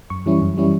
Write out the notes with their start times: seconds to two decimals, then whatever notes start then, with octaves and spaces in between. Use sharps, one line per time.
0.10 F#2 C#6
0.26 E3 G3 C#4 E4
0.42 F#2
0.56 E3 G3 C#4 E4